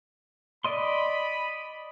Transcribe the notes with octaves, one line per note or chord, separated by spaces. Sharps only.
D5 D#5 B5 C6